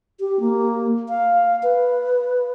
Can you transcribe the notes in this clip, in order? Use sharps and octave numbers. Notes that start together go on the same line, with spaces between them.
G4
A#3
F5
B4